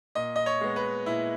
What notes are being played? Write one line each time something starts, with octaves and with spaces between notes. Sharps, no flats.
A#2 D#5
D#5
C#5
G#3 B3
B4
A#2 E4